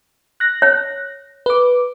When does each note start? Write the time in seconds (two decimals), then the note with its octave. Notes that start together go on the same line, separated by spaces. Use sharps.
0.40 F#6 A#6
0.62 C#5
1.46 B4 D6